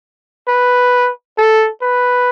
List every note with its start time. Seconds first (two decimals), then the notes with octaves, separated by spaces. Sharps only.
0.48 B4
1.38 A4
1.82 B4